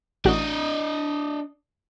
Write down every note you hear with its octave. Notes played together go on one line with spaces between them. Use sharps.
A1 D4 F#4 D#5